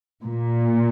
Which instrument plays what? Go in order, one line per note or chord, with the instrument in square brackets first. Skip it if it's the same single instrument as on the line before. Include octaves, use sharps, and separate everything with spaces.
[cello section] A#2